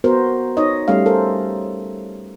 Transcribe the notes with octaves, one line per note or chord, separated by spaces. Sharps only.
B3 F#4 A#4 C5
D#4 C#5 D#5
G3 A3 C#4 F5
A4 A#4 C5